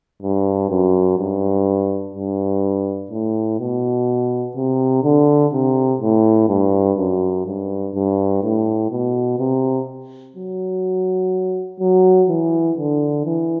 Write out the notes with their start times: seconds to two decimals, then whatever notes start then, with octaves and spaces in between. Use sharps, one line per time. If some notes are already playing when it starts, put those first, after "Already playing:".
0.22 G2
0.70 F#2
1.18 G2
2.15 G2
3.11 A2
3.60 B2
4.56 C3
5.04 D3
5.53 C3
6.01 A2
6.49 G2
6.98 F#2
7.46 G2
7.95 G2
8.43 A2
8.91 B2
9.39 C3
10.36 F#3
11.80 F#3
12.29 E3
12.78 D3
13.25 E3